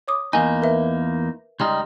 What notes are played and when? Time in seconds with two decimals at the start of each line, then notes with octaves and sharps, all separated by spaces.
0.08 C#5 D6 D#6
0.33 E2 A#3 D#4 G#5
0.62 A#4 B4 E5
1.60 C#2 G3 D#4 C6 F6